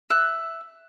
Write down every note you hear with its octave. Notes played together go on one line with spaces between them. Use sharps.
E5 F#6